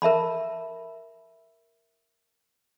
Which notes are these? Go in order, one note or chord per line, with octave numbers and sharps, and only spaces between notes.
A#4 E5 A5 B5